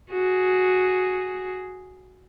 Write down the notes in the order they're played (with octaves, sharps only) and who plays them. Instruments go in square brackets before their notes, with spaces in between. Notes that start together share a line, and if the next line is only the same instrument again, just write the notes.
[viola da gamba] F#4 G#4